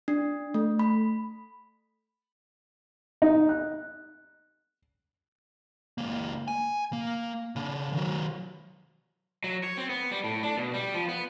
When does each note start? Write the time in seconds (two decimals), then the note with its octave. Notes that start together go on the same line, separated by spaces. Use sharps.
0.08 D4
0.54 A3
0.79 B5
3.22 D#4
3.49 F#6
5.98 C#2 A#3
6.48 G#5
6.93 A#3
7.56 C#3 D4
7.93 D#3 F#3
9.44 F#3
9.64 C#5
9.78 C4
9.89 B3
10.11 G3
10.24 A2
10.43 D4
10.57 B2
10.74 G3
10.94 F3
11.09 B3